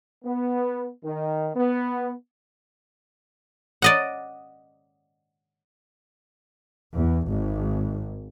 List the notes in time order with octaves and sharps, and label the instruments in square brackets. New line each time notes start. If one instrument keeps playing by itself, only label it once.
[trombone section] B3
D#3
B3
[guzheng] D5 D#5 F#5
[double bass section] E2
G#1